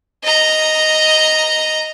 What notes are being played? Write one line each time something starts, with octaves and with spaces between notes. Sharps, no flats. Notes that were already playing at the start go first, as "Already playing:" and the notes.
D#5 A#5